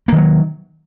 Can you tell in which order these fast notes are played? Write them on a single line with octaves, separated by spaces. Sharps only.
A#3 D#3 F#3